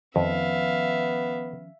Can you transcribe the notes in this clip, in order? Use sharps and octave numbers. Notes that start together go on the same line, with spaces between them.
F2 D#3 F3 B3 C#4 E5 F5